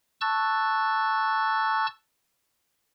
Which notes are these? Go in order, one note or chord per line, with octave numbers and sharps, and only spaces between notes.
A5 C#6 E6 F#6 A6